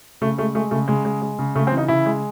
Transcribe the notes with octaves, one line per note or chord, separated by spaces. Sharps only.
C#3 A3
G#3 A3
G#3 A3
C#3 A3
C#3 G#3
G#3
G#3
C#3
C#3 A3
C4
E3
D#4
C#3 E4
G#3